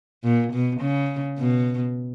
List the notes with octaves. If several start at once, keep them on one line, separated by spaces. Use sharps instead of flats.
A#2
B2
C#3
B2